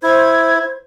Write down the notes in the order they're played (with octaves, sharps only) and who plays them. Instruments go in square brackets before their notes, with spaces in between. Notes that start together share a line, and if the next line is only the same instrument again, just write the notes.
[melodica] E4 [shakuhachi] C5 [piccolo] G#6